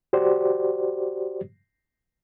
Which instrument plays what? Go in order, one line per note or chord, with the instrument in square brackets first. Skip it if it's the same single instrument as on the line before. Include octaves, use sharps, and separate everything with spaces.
[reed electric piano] F#4 G4 C5 D5